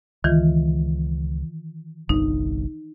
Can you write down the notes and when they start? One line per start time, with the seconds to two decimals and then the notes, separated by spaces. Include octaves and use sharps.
0.24 C#2 D#3 E3 F4
2.09 G1 C2 G2 D#4